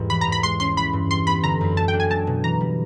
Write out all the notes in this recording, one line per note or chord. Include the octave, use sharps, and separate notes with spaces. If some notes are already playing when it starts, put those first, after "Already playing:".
Already playing: E2 G#2 G3 B3
E3 B5
A#5
G#2
B5
G#3 C6
C#4 C6
E3 B5
G2
G3 C6
B3 B5
D3 A#5
F#2
A3 A5
G5
D4
G#5
F#3 A5
B2
E3 A#5
G3